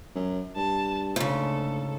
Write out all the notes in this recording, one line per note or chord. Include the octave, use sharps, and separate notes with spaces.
F#2
G2 A5
D2 G#2 C#3 A4